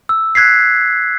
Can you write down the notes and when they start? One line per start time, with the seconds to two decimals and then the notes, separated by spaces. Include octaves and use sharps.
0.09 E6
0.35 F#6 G#6 B6 C7